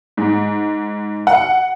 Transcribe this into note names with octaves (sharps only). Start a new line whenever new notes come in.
G#2
F#5